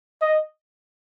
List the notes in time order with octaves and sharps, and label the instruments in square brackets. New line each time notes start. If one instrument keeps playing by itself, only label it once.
[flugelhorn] D#5